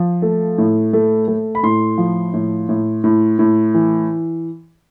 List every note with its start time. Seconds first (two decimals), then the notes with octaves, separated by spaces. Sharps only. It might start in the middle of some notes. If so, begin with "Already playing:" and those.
Already playing: F3
0.22 A3
0.58 A2
0.93 A3
1.28 A3
1.55 B5
1.63 A2 C6
1.98 F3
2.33 A2
2.69 A2
3.04 A2
3.39 A2
3.74 E3